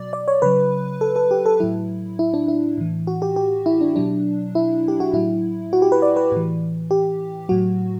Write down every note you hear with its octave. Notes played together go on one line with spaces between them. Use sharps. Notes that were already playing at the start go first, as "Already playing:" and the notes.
Already playing: B2 F#3 D5
D5
C#5
C#3 F#3 B4
A4
A4
G4
A4
A2 F#3 E4
E4
D4
E4
A2 E3
F#4
G4
G4
E4
D4
B2 F#3 D4
E4
G4
F#4
A2 F#3 E4
F#4
G4
B4
D5
B4
A2 E3
G4
A2 F#3 F#4